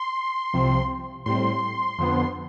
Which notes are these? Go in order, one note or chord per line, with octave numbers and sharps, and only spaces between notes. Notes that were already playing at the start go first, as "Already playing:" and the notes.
Already playing: C6
C2 C3 F3 C4
A2 G3 C4 C6
F2 D3 F3 B3